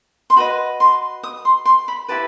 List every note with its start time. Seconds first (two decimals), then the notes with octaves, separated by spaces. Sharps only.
0.30 C6
0.36 F#4 B4 D#5 B5
0.80 C6
1.23 D#6
1.45 C6
1.65 C6
1.88 B5
2.08 E4 G4 B4 A5